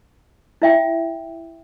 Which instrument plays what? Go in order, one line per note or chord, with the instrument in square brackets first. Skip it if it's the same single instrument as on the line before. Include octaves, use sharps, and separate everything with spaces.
[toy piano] E4 E5 G5